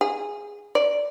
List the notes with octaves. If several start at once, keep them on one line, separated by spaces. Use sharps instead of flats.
G#4
D5